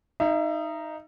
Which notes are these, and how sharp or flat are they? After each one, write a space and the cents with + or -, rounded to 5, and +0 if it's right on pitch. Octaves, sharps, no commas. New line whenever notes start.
D#4 +0 E5 +35